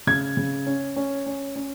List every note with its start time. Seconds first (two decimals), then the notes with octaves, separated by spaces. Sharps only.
0.07 C#3 G#6
0.37 C#3
0.66 C#4
0.96 C#4
1.26 C#4
1.56 C#4